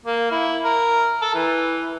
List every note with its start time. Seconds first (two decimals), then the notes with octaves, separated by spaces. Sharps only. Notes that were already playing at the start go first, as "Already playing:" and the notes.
0.05 A#3
0.31 E4
0.64 A#4
1.22 A4
1.34 E3